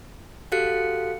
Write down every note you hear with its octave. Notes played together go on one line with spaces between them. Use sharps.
F#4 G4 A4 F5 F#6 C#7